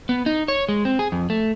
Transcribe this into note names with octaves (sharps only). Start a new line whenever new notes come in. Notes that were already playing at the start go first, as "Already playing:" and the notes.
B3
D#4
C#5
G#3
C4
G#4
F2
A3